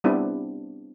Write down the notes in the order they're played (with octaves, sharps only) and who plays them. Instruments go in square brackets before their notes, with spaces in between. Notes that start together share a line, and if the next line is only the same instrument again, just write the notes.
[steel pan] G3 B3 C4 D4 E4